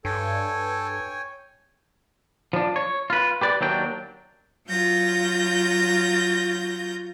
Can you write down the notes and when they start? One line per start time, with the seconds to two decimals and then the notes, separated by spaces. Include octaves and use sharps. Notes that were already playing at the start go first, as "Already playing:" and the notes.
0.05 G2 A4 C#5 G5 G#5
2.53 F3 D4
2.76 C#5
3.10 F4 B4
3.41 G4 B4 D5
3.61 D#2 F#3 D4 G5
4.69 F#3 F4 G6 A#6